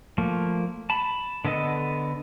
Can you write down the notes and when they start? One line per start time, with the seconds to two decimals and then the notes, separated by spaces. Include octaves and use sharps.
0.18 F3 A3 A#3
0.90 A5 B5
1.45 D3 B3 A4 D#5